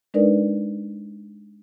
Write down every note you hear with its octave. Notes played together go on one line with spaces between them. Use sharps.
G#3 D4 D#4 A#4 B4 D5